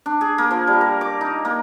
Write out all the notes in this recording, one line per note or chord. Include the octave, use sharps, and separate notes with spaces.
D4
G#4
A#3
F3
G3
A#4
D6
D#4
A#3